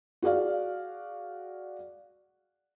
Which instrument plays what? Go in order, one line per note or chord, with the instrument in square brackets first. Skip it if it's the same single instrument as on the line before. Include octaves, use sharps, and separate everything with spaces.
[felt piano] F#4 G#4 D5 F5